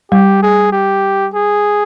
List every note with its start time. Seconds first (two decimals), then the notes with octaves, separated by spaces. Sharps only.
0.11 G3 G4
0.43 G#4
0.72 G4
1.34 G#4